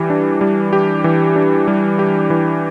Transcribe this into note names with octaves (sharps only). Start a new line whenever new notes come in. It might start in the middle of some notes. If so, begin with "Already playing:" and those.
Already playing: E3 G3 G4
D4
G3
G4
E3
D4
G3
G4
E3